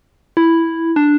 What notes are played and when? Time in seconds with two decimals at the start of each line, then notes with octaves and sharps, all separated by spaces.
0.37 E4
0.96 D4